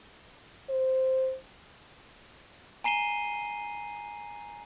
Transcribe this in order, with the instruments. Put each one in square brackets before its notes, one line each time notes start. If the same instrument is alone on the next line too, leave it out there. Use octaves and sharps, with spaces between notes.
[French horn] C5
[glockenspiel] G#5 A#5 C7 D#7 G7